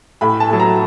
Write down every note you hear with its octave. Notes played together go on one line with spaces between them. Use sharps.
A2 B5
A5
F#3 A3
A#5